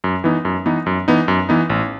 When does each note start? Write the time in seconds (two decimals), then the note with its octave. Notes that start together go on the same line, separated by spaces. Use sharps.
0.04 F#2
0.24 E3 B3 D#4
0.45 F#2
0.66 E3 B3 D#4
0.86 F#2
1.08 E3 B3 D#4
1.28 F#2
1.49 E3 B3 D#4
1.70 A1